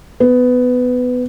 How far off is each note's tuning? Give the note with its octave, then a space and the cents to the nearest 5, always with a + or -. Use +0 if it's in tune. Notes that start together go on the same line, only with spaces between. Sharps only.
B3 +15